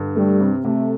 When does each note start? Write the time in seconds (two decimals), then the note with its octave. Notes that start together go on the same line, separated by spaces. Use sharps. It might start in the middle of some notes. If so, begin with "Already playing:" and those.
Already playing: G2 D3
0.16 G3 A3
0.40 C3
0.64 C3 A3